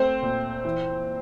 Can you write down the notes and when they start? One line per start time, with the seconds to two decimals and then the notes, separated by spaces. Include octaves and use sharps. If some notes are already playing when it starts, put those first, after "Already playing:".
Already playing: A3 C4 C5
0.22 A#2
0.65 E3